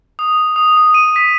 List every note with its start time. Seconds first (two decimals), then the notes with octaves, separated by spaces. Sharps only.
0.19 D#6
0.56 D#6
0.77 D#6
0.94 D#7
1.16 B6